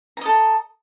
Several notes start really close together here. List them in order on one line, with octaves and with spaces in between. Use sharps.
A#5 D#5 A4